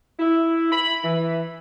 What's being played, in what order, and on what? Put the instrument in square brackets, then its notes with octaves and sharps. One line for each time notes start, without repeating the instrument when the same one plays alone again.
[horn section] E4
B5
E3